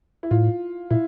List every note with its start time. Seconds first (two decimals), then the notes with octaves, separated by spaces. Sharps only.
0.23 E4
0.31 A2 F4
0.90 A#2 E4